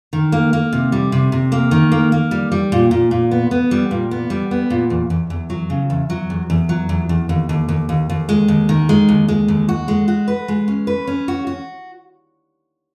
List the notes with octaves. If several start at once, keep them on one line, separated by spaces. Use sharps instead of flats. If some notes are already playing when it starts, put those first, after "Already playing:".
D#3
A#3
A#3
C3
G3
C3
C3
A#3
D#3
A#3
A#3
G3
G3
A#2
A#2
A#2
B3
B3
G3
A#2
B3
G3
B3
A#2
E2
E2
E2
F#3
C#3
E2
F#3
E2
E2
F#3
E2
E2
D#2
D#2
D#2
D#2
D#2
G#3
D#2
D#3
G#3
D#2
G#3
D#2
F#4
G#3
F#4
B4
G#3
C#4
B4
C#4
F#4
F#4